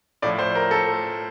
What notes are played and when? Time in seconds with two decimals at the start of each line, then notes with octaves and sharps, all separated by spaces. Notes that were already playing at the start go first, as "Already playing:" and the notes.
0.22 A2 F3 D5
0.39 C5
0.55 A#4
0.71 A4